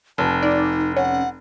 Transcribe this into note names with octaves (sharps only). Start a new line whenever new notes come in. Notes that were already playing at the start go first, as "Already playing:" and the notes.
F1 A5
D#4 D5
C#4 F#5